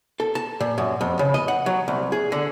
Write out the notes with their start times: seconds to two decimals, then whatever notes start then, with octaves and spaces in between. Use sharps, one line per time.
0.20 A4
0.35 A5
0.60 A#2
0.78 F#2
1.01 F2
1.19 C#3
1.34 D#5
1.48 F#5
1.66 F#3
1.88 C2
2.12 G#4
2.32 D3